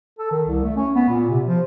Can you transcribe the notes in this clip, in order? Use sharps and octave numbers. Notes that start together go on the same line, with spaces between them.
A4
D#3
C2
A3
C#4
B3
A#2
C3
F3